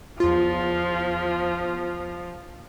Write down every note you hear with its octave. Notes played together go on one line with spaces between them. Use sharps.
E2 F3 F4